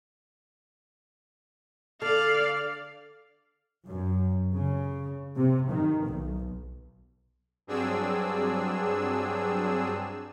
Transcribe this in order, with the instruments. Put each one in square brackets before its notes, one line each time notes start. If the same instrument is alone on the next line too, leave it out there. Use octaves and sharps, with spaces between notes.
[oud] D3 A4 [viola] D5 F5
[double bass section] F#2
C#3
C3
D#3
B1
[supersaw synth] G2 F#3 C4 D4 G#4 E6